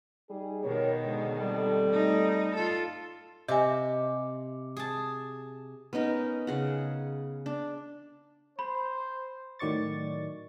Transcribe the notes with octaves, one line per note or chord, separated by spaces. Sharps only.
G3 D#4 G#4
B2 D#3 G4 A#4 C#5
G#2 D3 G#3
G3 C4 G4 A4
A3 D#4
F4 A4
C3 G4 D#5 E5 G#5
G#4 A5
B3 C#4 D#4 A#4
C#3 G#4 F#5
D4
C5 B5
A2 D#3 F#3 D5 C#6 A6